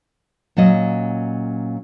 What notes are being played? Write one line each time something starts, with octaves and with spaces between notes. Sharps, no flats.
A#2 F#3 C#4 D#5